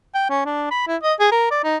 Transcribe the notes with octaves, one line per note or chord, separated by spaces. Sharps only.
G5
C#4
D4
B5
E4
D#5
G#4
A#4
D5
D#4